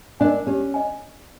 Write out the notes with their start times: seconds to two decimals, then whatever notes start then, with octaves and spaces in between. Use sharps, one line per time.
0.20 D4 A#4 D#5 G#5
0.47 C#4 G4
0.74 D#5 G#5